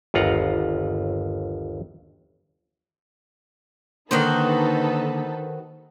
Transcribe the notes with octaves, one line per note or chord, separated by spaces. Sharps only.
G1 D#2 F4 F#5 A#5
D3 D#3 A#3 D#4 F#4 A4 B4 C5